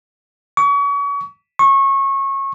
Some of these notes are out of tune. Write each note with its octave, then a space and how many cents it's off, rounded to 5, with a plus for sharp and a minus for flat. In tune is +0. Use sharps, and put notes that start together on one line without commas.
C#6 +35
C#6 -25